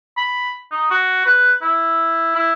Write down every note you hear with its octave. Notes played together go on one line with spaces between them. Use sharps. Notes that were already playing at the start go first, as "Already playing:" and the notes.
B5
D#4
F#4
B4
E4
E4